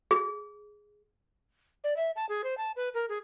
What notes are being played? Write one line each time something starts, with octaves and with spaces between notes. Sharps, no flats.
G#4
D5
E5
A5
G#4
C5
A5
B4
A#4
G#4